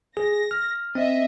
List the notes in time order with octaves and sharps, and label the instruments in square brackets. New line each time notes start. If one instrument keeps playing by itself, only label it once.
[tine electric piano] G#4 [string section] A#6
[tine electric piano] F6
[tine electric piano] C4 [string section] D#5 E5